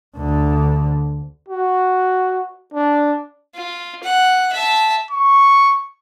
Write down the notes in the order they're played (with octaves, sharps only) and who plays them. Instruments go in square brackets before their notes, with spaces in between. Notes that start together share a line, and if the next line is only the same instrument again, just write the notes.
[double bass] D2 D3
[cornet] F#4
D4
[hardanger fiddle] F4
F#5
E5 A5
[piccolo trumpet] C#6